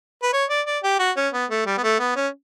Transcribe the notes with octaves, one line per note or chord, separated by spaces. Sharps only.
B4
C#5
D5
D5
G4
F#4
C#4
B3
A3
G3
B3
A3
B3
C#4